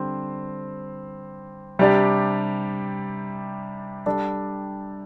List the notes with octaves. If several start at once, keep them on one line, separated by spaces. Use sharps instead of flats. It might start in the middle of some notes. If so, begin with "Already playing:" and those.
Already playing: D3 G3 C4 C5
C3 G3 D4 G4 D5
G3 D4 A4 D5